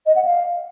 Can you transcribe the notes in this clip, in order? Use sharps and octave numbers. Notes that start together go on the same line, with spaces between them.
D#5
F#5
F5